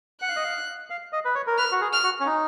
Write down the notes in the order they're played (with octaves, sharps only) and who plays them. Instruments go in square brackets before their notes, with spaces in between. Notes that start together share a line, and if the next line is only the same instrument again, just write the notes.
[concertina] F#5 [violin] F#6
[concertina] F5
D#5
F5
F5
D#5
B4
C#5
A#4
[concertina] B4 [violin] F6
[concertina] F#4
G#4
[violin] F6
[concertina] F#4
C#4
D#4